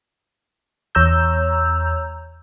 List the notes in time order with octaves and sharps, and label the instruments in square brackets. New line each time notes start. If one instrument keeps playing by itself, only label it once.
[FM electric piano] E2 C#5 A#5 E6 G6